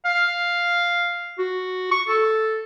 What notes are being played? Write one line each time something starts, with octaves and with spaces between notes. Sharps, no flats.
F5
F#4
C#6
A4